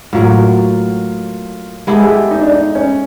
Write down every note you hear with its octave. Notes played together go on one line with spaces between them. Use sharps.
A2 F#3 A#3 F4
G#3 B3 E4 G4 A4
G#4
G4
D#4
D4
D#4
C#4